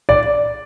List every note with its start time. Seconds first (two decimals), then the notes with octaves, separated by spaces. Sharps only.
0.09 D5